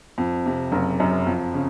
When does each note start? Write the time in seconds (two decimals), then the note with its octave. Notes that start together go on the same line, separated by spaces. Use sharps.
0.18 F2
0.46 C3
0.72 F#1
1.00 F#2
1.27 F2
1.54 C#3